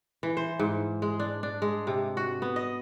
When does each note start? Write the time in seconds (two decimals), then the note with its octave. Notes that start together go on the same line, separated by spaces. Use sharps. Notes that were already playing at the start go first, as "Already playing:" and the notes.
0.23 E3
0.37 C5
0.59 G#2
1.02 G#3
1.20 D4
1.43 D4
1.62 G#3
1.87 C3
2.17 F#4
2.42 B3
2.56 D#5